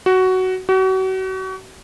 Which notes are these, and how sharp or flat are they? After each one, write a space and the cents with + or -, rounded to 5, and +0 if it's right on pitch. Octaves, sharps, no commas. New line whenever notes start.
F#4 +10
F#4 +35